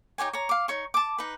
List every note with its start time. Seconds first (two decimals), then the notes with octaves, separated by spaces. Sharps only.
0.18 D#4 G4 C#5 G#5
0.33 C#5 A#5
0.49 F5 D6
0.68 D#4 C#5 C#6
0.94 A5 D6
1.18 D#4 B4